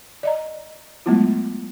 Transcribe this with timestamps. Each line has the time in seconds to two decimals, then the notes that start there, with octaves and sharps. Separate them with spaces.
0.23 D5 D#5 A#5
1.06 F#3 G#3 A3 B3 E4 F4